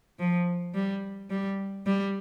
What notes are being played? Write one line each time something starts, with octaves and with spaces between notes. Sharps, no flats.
F3
G3
G3
G3